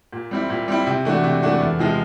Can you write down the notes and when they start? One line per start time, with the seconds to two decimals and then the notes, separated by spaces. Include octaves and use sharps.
0.13 A#2
0.31 G3 C4 E4
0.50 A#2
0.68 G3 C4 E4
0.87 C3
1.05 E3 A3 D4 F#4
1.24 C3
1.42 E3 A3 D4 F#4
1.60 E2
1.79 C3 F3 G#3